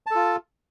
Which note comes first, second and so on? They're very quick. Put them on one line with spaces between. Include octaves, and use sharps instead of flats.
A5 A4 F4